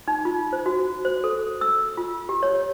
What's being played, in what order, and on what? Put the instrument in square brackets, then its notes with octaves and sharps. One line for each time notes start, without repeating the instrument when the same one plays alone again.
[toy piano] D#4
F4
C5
F#4
C5
A4
E6
F4
G4
C#5